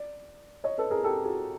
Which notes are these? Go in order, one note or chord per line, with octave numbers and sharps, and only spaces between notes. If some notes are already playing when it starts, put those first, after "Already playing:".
Already playing: D5
C#5 D#5
A4 B4
G#4 A#4
G4 A4
F#4 G#4